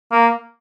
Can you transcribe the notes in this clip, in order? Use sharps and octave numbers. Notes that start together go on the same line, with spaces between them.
A#3